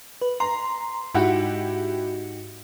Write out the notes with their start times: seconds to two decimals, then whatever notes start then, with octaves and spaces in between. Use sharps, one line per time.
0.22 B4
0.40 A#5 C6
1.14 G#2 D#4 E4 F#4 G4 F#5